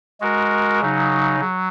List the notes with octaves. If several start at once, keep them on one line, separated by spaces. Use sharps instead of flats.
G#3 F#4 A#4
C#3 F#3 D#4
F#3